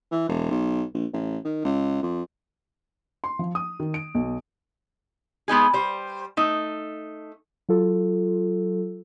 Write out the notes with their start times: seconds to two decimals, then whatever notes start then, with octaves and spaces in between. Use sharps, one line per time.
0.12 E3
0.29 E1
0.51 B1
0.94 A#1
1.13 A1
1.45 D#3
1.65 C#2
2.03 F2
3.24 C6
3.39 F3
3.55 D#6
3.80 D#3
3.94 D7
4.15 B1
5.48 G#3 B3 D#4 G#4
5.73 G3 C5
6.37 A3 D#4
7.69 F#3 F4 A4